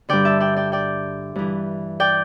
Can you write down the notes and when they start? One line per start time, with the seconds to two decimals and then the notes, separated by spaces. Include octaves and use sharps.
0.09 G2 D3 D5 G5
0.25 E5 A5
0.40 D5 G5
0.56 D5 G5
0.72 D5 G5
1.36 G2 E3
2.00 D5 G5